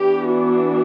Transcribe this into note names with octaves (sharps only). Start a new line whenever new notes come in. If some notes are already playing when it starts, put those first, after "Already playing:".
Already playing: E3 B3 D4 G4
F#4